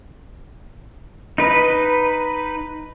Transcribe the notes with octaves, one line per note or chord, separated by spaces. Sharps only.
D#4 B4